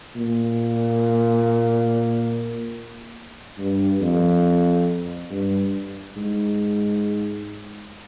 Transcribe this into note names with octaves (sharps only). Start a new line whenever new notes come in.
A#2
G2
F2
G2
G#2